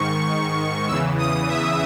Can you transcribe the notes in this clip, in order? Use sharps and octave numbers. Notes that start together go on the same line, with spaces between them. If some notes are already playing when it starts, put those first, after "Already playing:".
Already playing: G#2 D#3 C#6
E2 C#3 E3 E6
D#6
E5